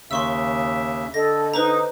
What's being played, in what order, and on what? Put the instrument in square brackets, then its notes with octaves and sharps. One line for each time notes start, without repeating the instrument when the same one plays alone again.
[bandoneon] D#2 C#3 E5 [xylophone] C6 C#6 E6
[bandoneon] D3 [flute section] A4 D#5 [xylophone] A#6
[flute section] D#4 [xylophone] B4 C5 A#5